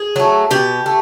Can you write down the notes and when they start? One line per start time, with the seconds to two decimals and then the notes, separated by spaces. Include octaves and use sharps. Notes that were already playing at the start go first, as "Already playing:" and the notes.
Already playing: G#4
0.16 F#3 A3
0.51 B2 G4
0.86 A3